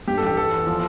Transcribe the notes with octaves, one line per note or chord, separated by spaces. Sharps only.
G2 G4
A4
A1 G4
E3 A4
E2
F3